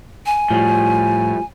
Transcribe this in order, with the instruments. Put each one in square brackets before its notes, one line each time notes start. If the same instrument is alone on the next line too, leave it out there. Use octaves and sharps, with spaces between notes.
[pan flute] G#5
[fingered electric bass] A2 [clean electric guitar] F3 G3